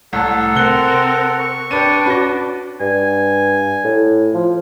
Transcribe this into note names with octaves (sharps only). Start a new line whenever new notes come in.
C2 A2 A4 F#5 A5
C3 C4 A#4 F#6 G7
C#6
D4 G4 B4 D#7
C#4 F#4 B4 C#5 A#6
G2 G#5
A2
F3